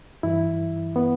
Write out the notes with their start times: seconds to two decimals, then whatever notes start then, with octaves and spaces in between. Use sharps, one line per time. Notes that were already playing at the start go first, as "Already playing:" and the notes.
0.23 G2 E3 E4
0.96 B3